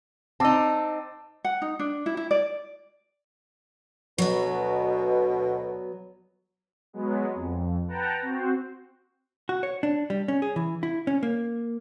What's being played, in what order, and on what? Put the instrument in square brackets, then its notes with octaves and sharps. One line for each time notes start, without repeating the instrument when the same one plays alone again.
[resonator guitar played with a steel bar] C4 D#4 [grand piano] A5 D6 E6
[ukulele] F#5
D#4
D4
E4
E4
D5
[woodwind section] D2 B2 [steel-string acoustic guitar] F#3 B3
[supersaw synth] F#3 G#3 B3
F2
B4 F#5 G5 A5 A#5
C4 F#4 C5
[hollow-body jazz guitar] F#4
C#5
D4
G3
C#4
G#4
E3
E4
C#4
A#3